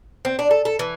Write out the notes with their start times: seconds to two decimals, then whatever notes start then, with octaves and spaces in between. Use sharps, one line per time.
0.25 C4
0.39 D4
0.51 A4
0.65 A4
0.79 E3